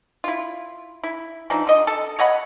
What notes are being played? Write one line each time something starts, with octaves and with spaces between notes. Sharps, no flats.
E4 F4
E4
E3 F3 D4 D#4
D3 D#5
A4
C#5 D#5 F#5 B5